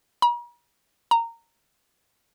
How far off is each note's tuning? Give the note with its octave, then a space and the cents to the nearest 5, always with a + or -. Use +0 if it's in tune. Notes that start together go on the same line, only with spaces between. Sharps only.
A#5 +45
A#5 -15